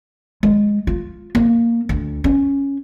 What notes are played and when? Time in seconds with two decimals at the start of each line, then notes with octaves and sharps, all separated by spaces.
0.43 G#3
0.87 F4
1.35 A#3
1.89 D2
2.24 C#4